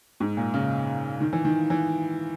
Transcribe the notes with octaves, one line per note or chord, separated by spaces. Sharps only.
G#2
A#2
C#3
D#3
E3
D#3
E3